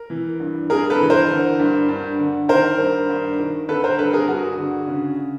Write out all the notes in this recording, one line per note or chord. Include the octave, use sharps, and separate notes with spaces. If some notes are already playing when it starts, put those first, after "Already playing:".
Already playing: A#4
E3
G2
G2 G#4 A#4
A4 B4
E3
A#4 C5
D3
G2
G2
D3
D#3 A#4 C5
G2
G2
D#3
D3 A4 B4
A#4 C5
G2 A4 B4
G#4 A#4
G2 F#4 G#4
D3
C#3